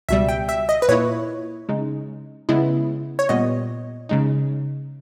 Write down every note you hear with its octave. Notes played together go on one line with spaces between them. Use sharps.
C#2 B2 G3 E5
G5
E5
D#5
B4
A#2 A#3 E4 C#5
C#3 G#3 D#4
C#3 G#3 B3 E4
C#5
A#2 G3 B3 D#5
C#3 G#3 D#4